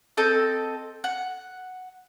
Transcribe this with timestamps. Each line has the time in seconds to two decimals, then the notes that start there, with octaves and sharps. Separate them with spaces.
0.17 C4 A4 D#5 G6
1.04 F#5